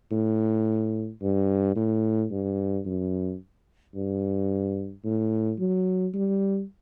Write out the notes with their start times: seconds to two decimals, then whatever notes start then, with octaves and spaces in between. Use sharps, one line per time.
0.12 A2
1.22 G2
1.76 A2
2.31 G2
2.86 F#2
3.95 G2
5.05 A2
5.59 F#3
6.14 G3